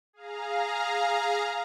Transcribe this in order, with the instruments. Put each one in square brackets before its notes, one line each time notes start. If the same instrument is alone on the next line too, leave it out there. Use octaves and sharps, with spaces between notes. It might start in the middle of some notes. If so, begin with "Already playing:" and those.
[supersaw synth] G#4 F5 A#5